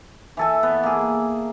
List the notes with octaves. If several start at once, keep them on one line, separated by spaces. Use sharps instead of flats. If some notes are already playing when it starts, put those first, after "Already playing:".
E3 A4 G#5
B3
A#3 G#4